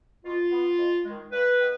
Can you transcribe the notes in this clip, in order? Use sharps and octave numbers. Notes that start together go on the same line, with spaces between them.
B2 F4
B3
F2
D#3 G#3
G2 B4
D#3 B3